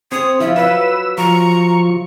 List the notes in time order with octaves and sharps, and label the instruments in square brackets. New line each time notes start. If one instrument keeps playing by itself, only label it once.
[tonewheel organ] C4 [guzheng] C#5 [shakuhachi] D#6
[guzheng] F3 [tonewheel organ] E4 [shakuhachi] E5
[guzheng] F#3 [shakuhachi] B4 [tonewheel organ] E6
[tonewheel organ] F3 C#6 [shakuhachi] A#5